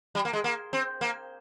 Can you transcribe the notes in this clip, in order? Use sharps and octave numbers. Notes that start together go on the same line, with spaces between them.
G3
A#3
G#3
A#3
C4
A#3